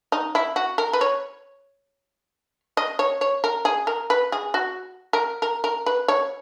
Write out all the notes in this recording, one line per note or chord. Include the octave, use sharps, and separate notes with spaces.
D#4
E4
F#4
A#4
B4
C#5
D#5
C#5
C#5
A#4
G#4
A#4
B4
G#4
F#4
A#4
A#4
A#4
B4
C#5